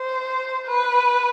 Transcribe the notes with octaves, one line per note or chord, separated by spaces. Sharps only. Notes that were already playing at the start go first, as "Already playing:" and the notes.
Already playing: C5
B4